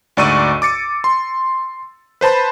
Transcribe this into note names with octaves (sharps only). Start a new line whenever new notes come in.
D2 G#2 D5 C#6 E6 D#7
D6 A6 C#7
C6
B4 C5 A5 B5